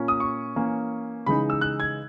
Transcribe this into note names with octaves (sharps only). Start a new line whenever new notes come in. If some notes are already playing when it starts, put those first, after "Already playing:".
Already playing: A#2 A#3 C#4
D#6
C#6
E3 A#3 C#4
C#3 E3 G#3 D#4 B5
E6
F#6
G#6